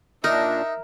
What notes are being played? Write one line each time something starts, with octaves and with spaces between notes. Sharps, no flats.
A#2 D4 D#4 A#4 E5